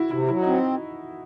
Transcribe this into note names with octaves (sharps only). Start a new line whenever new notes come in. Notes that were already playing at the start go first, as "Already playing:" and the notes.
Already playing: E4 F#4
C3 E4
F#3 E4
C4 D#4